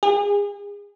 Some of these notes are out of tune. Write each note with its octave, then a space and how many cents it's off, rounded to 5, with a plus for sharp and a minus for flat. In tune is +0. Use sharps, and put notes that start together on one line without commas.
G#4 -35